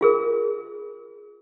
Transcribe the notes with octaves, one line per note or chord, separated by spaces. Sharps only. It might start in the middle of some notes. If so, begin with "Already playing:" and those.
F4 G#4 A#4